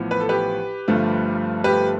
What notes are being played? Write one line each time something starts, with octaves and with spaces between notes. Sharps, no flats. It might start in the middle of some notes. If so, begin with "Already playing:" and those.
Already playing: A1 A2 F3 B3
B4
A4
G4 B4
G1 G2 F3 A3
G4 B4